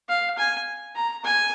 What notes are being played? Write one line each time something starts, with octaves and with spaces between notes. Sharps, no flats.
F5
G#5
A#5
G#5